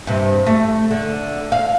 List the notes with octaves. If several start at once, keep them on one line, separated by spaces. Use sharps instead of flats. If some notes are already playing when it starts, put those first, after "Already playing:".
G2 C3
A3
D3
F5